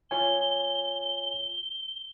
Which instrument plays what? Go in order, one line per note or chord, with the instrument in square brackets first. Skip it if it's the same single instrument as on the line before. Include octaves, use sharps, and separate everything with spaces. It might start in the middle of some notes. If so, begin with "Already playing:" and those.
[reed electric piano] F4 C#5 G#5 [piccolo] G7